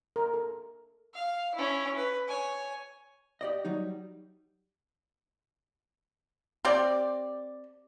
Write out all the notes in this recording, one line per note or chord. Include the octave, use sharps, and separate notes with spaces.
A#4
A4
F5
C#4 E4
B4
C#5 G#5
G4 D5 D#5
F#3 G3 D#4
C4 G4 D5